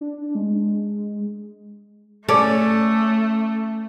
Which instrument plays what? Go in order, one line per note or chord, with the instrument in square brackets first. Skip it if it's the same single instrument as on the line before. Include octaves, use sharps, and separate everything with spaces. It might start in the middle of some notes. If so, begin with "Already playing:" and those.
[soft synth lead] D4
G#3
[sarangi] A3 [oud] C#4 [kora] A4 D5